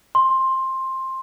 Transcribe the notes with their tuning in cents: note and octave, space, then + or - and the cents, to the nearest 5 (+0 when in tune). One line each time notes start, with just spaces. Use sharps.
C6 +15